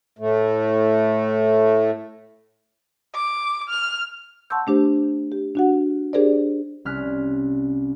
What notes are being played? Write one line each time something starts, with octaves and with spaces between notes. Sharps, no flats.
A2 A3
D6
F6
F#5 A5 C6 C#6 E6 G6
A3 D4 G4 C5
G4
D4 F#4 F#5
D4 G4 G#4 A#4 C5 D5
C2 C#4 F6 F#6 B6